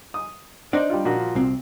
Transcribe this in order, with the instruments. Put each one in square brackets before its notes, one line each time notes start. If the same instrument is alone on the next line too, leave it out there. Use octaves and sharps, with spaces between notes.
[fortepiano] D#6
[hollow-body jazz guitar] D4 D#4 D5 [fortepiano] C5
[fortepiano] G3 F4
A#2 F3 F#4
[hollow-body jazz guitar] C2 C4